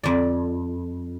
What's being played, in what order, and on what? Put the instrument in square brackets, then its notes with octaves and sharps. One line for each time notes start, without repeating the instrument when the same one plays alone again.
[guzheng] F2 D5